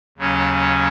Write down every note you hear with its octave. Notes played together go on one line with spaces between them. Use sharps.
D#2 C#3 F#3 C#4